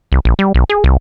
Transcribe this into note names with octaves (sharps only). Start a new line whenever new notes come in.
C2
A#1
G3
B1
G#4
C2